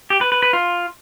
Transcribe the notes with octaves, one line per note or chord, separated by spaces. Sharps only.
G4
B4
B4
B4
F4